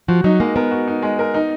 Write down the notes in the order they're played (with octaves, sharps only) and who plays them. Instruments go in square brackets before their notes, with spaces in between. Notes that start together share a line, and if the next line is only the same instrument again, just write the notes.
[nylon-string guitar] F3 [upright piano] F#4
[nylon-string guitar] F#3 [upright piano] D#4
[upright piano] G#3 [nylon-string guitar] A#3
[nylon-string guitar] B3 [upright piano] A#4
[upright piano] F#4
D#4
G#3
A#4
D#4